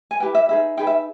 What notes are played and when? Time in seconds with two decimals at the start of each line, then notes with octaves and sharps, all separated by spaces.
0.11 G#5
0.20 E4 G4 B4 G5
0.35 E5
0.49 D#4 G#4 B4 E5
0.77 D#4 G#4 B4 G5
0.87 E5